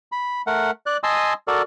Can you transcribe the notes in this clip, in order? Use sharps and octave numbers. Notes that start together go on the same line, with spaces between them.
B5
A3 A#4 F#5
D5 F#6
D#5 G#5 A5 C6 D#6 E6
F#4 A4 A#4 D5